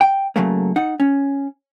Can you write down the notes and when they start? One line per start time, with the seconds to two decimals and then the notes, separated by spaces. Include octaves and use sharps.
0.01 G5
0.36 C#3 F#3 A3 A#3
0.76 D#4 F#5
1.00 C#4